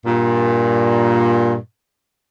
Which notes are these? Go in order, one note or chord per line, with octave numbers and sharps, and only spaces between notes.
G2 A#2